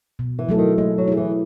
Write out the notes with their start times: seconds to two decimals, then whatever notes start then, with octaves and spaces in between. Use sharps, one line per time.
0.19 B2
0.39 E3
0.49 F#3 A3 E4 A4
0.58 D#3
0.78 G#3 A3
0.98 F#3
1.08 E4 G#4
1.17 E3